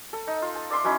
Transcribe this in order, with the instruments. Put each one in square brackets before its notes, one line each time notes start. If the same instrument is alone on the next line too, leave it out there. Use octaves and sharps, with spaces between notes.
[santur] A4
D#4
F4
A5
D5 E5 C6 D6
F#3 C#4 D#4 E4